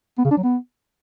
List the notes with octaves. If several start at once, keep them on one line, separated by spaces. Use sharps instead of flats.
B3
C#3
D4
F#3
B3